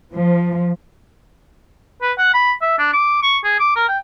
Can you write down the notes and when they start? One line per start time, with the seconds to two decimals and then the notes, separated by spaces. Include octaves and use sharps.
0.14 F3
2.02 B4
2.18 F#5
2.34 B5
2.62 E5
2.79 D4
2.93 D6
3.23 C#6
3.44 G#4
3.60 D6
3.76 A#4
3.89 G5